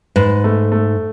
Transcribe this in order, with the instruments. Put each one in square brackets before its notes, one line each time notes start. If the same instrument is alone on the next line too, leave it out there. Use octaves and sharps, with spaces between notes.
[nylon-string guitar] G#2 [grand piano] B4
[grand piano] A3
A3